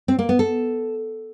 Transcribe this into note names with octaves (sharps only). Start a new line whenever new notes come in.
C4
A#3
B3
A4